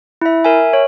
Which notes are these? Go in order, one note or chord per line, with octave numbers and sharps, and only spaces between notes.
E4 E5
A#4 E5 G#5
C#5